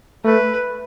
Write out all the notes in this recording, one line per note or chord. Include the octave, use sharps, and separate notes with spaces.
A3 B4